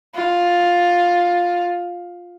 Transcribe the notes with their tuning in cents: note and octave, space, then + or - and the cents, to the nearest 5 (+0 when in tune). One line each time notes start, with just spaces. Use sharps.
F4 +10